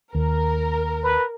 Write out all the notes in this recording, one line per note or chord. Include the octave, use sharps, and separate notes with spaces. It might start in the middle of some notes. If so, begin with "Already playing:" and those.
D#2 A#4
B4